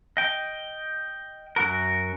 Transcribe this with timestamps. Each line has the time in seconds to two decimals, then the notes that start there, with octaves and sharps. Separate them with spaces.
0.17 D#5 G5
1.56 F#2 F#4 A#4